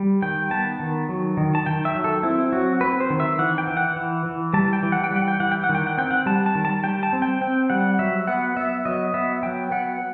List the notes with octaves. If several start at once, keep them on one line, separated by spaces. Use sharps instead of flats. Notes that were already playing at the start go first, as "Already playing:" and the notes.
Already playing: G3
D#3 G5
B3 A5
D#3
F#3
D#3
A5
D#3 G5
E5
F#3
A4
C4 E4
F#3 F#4
C4 B4
C5
D#3
E5
E3 F#5
G5
E3
F#5
E3
E3
G3 A5
G5
E3
F#5
G5
G3
F#5
G5
E3 F#5
G5
F#5
D#3
G5
F#5
C4 G5
F#5
G3 A5
A5
D#3
A5
G3 G5
A5
C4
G5
C4 G5
G3 F#5
F#3 E5
B3 F#5
B3 E5
F#3 D#5
B3 E5
F#3 G5
B3 F#5